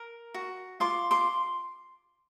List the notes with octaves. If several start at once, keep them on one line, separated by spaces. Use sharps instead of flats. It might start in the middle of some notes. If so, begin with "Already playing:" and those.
Already playing: A#4
F#4
F4 C6 D6
C6 D6